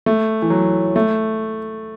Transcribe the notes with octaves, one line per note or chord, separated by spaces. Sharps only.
A3
E3
F#3
A3